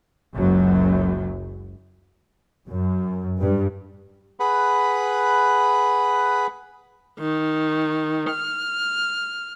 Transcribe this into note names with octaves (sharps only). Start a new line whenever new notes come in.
F#1 C#2 F#2 F#3
F#2
G2
G#4 B4 F#5 B5
D#3
F6